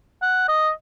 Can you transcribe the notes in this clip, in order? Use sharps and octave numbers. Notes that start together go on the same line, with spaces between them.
F#5
D#5